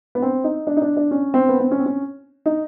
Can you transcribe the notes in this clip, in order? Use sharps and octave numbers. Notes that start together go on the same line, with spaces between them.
B3
C4
D#4
D4
D#4
D4
D4
C#4
C4
B3
C4
C#4
C4
C#4
D#4